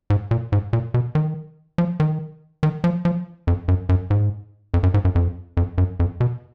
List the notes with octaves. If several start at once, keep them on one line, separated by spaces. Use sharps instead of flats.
G#2
A#2
G#2
A#2
B2
D#3
F3
D#3
D#3
F3
F3
F2
F#2
F#2
G#2
F2
F#2
G#2
F#2
F2
F2
F#2
F2
B2